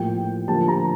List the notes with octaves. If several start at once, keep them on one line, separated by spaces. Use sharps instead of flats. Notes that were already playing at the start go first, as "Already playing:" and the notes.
Already playing: A2 F3 A#3 G5
D3 F3 A#3 A5
A#5